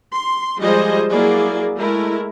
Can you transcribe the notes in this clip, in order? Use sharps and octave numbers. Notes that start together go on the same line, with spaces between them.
C6
F3 G3 G#3 G#4 C5 D#5
F#3 A#3 E4 G#4 D5
G#3 A3 E4 A#4